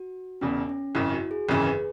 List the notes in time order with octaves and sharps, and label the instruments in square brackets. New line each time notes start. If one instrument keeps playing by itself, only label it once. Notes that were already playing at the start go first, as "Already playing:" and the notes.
Already playing: [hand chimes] F#4
[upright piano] E1 E2 C#3 [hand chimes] C#4
[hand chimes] C#4
[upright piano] G#1 F#2 C#3 [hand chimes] E4
[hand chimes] F#4
G#4
[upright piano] G#1 F#2 C#3 E3 [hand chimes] G#4
[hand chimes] B4